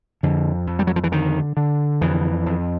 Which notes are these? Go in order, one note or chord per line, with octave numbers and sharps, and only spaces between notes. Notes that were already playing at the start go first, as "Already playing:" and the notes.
F2 D3
F2
G3
F#3
F3
E3
D3 D#3
D3
F2 E3
F2